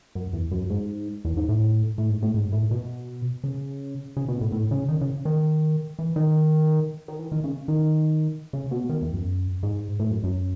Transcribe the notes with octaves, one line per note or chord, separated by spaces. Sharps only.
F#2
E2
F#2
G#2
E2
G#2
A2
A2
G#2
A2
G#2
A2
B2
C#3
C#3
B2
A2
A2
C#3
D#3
C#3
D#3
E3
D#3
D#3
E3
D#3
C#3
D#3
C#3
B2
D#3
E2
F#2
G#2
A2
F#2
F#2